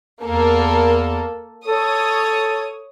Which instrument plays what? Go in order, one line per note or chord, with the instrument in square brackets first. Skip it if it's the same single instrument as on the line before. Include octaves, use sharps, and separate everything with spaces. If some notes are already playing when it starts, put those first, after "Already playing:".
[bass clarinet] E2 [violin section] A#3 A4
[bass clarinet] A4 [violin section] C#5 D#6